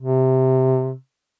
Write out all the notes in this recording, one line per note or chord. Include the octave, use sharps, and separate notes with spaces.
C3